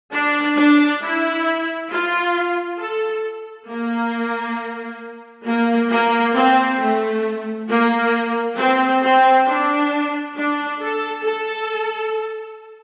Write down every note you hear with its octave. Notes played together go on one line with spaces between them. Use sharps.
D4
D4
E4
F4
A4
A#3
A#3
A#3
C4
A3
A#3
C4
C4
D4
D4
A4
A4